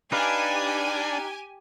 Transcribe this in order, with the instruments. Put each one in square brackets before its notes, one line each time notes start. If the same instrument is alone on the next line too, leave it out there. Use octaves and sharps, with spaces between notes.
[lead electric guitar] D4 [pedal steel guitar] D#4 B4 F5 [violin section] G4 G#5